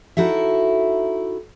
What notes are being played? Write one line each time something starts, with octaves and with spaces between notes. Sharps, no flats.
D#4 E4 F#4 A4 E5